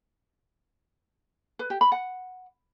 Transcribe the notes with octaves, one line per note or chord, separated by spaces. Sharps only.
B4
G4
B5
F#5